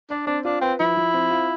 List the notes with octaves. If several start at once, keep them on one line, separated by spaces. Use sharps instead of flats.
D4 D5
C4 D4
D4 F4
C4 B4
F3 E4
F3
C4
F4